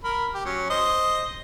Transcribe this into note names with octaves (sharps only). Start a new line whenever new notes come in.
A#4 B5
G4
F#3 C#4
C5 D#5